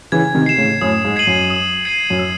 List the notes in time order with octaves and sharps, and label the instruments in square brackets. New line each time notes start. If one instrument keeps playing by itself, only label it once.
[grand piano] C#3 E3 [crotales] G#6
[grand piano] C3 D#3
[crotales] C7 E7
[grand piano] A2 C#3
[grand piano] F#2 A2 [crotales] D#6
[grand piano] G#2
[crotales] G#6 C7 D#7 F#7
[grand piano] F#2
[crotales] D#6
G#6 C7 D#7 F#7
[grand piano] F#2
[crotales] E6